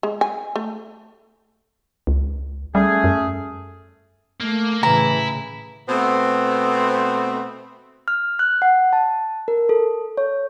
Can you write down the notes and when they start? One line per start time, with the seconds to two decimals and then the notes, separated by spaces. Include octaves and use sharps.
0.03 G#3
0.21 G#5
0.56 A3
2.07 C#2
2.75 G3 A3 C#4 G#4
3.04 F#2
4.41 A3 A#3
4.83 A2 C#3 E3 E4 A#5
5.89 B2 A3 B3 C4
8.08 F6
8.39 F#6
8.62 F#5
8.93 A5
9.48 A#4
9.69 A4
10.18 C#5